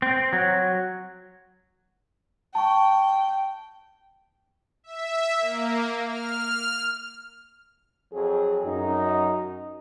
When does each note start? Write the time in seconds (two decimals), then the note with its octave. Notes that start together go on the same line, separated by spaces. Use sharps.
0.02 C4
0.33 F#3
2.55 G5 A5 C#6
4.84 E5
5.37 A#3
6.07 F6
8.13 F2 F#3 C4 G#4
8.65 F#2 D#4